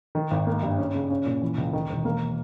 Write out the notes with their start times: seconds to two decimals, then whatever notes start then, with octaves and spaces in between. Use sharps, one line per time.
0.15 D#3
0.31 G#1
0.47 A#3
0.63 G2
0.78 C#4
0.94 C#3
1.10 C#4
1.26 A#2
1.42 E3
1.58 C#2
1.73 D#3
1.89 E1
2.05 A#3